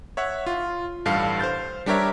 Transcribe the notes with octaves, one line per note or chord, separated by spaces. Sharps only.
C#5 E5 F#5
F4
A1 G2 A4 F5 C7
C5 F5 G6 A6
G3 D4 G4 A#4 C#5 E5